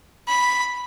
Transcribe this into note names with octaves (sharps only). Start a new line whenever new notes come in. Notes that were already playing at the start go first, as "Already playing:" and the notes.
B5